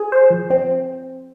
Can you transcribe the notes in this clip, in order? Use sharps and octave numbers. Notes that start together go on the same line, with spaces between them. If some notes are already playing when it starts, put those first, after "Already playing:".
Already playing: G#4
C5
F3
C4